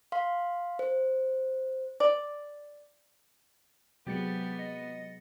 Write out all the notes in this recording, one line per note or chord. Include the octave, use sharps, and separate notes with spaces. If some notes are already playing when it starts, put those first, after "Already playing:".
F5 C6
C5
D5
C3 F#3 G#3 B3 G4 A6 C#7
D#5